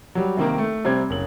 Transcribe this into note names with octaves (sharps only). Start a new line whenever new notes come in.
F#3 G3
C3 D#3 A#3
A3
C3 G3 C4 G#6
F#1 F#7